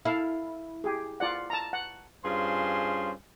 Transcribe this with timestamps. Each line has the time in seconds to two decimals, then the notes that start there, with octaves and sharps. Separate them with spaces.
0.05 E4 A4 F5
0.84 G4 G#4
1.20 F4 D5 F#5
1.50 A5 A#5
1.73 F#5
2.24 G2 C#4 F4 G#4 C5 C6